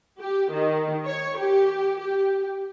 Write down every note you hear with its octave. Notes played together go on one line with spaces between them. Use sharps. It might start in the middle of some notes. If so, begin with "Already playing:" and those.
G4
D#3
C#5
G4
G4